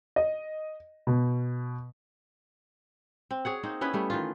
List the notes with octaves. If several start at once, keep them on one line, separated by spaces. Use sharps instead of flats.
D#5
B2
C4
G#4 C#5 F#5
A#3 C4 D#4
B3 C#4 E4 B4
G3 A3 B3
D#3 E3 F4